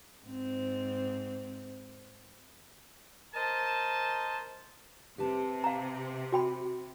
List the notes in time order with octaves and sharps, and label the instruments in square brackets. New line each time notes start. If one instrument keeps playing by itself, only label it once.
[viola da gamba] G#2 C4
[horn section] A#4 C5 D#5 A5
[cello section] C3 [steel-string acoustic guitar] G4 B4 A5
[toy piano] F5 A#5
F#4 G5 B5